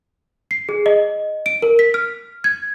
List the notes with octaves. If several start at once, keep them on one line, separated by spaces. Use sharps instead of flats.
C7
G#4
D#5
D7
A#4
B6
F6
G#6